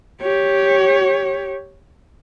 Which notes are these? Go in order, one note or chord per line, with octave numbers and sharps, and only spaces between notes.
G4 C#5